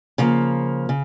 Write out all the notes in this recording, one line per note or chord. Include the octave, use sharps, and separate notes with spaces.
C#3 F3 A#3
C#3